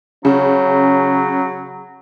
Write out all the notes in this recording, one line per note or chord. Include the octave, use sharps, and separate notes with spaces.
C#3 F#3 C#4